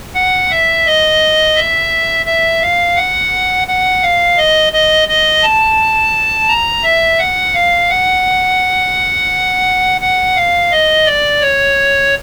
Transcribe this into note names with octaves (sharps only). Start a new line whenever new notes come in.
F#5
E5
D#5
E5
E5
F5
F#5
F#5
F5
D#5
D#5
D#5
A5
A#5
E5
F#5
F5
F#5
F#5
F5
D#5
D5
C#5